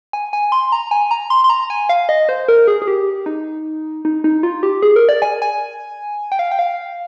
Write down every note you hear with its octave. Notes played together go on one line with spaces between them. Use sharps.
G#5
G#5
C6
A#5
G#5
A#5
C6
C6
A#5
G#5
F5
D#5
C5
A#4
G#4
G#4
G4
D#4
D#4
D#4
F4
G4
G#4
A#4
D5
G#5
G#5
G5
F5
G5
F5